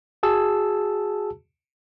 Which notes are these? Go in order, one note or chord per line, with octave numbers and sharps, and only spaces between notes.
F#4 G#4 A5 E6